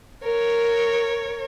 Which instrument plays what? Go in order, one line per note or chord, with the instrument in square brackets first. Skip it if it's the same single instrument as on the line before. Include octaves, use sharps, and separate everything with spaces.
[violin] A#4 C#5